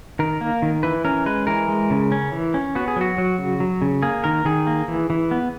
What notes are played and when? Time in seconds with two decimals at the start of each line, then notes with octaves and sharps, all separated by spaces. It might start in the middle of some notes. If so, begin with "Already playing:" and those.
0.19 D#3 A#4
0.41 A#3
0.62 D#3
0.83 E3 B4
1.05 C#4 A#4
1.26 G#3 B4
1.47 E3 A#4
1.69 G#3
1.91 C#3
2.12 C#4
2.32 E3
2.54 C#4
2.75 B3 F#4
2.88 G#4
2.96 F#3 F#4
3.18 F#3
3.38 C#3
3.60 F#3
3.82 C#3
4.03 A#3 G#4
4.24 D#3 A#4
4.45 D#3 G#4
4.67 A#3
4.88 E3
5.10 E3
5.31 B3